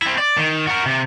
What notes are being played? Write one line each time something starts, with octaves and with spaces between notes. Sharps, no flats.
C4 E4
D5
D#3
F#4 A#4
C3